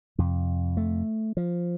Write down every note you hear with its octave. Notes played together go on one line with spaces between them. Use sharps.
F2 C3
A3
F3